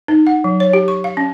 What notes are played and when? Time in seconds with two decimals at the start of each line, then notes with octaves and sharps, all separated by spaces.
0.08 D#4
0.27 F#5
0.44 F#3
0.60 C#5
0.73 G4
0.88 C#6
1.04 F5
1.17 C#4